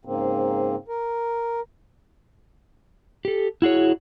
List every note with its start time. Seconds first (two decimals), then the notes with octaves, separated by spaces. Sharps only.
0.05 G#2 C#3 A#3 C4
0.88 A#4
3.25 G4 A4
3.62 E4 F#4 G#4 C#5